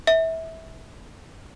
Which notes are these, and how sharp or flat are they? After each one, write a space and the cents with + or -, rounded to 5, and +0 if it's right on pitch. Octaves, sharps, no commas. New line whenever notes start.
E5 -20